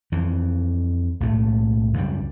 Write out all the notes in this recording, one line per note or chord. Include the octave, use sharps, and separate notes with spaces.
F2 E3
B1 A2 A3
C#2 F#2 G3